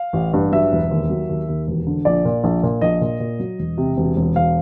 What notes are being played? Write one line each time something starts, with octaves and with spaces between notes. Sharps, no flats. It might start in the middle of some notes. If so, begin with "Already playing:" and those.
Already playing: F5
A1
G2
F#3 E5
E1
D#2
F#3
D#2
D#2
E1
D3
A#1 D5
A#2
A#1
A#2
A#1 D#5
A#2
A#2
F#3
E1
C3
E1
E1
E1 F5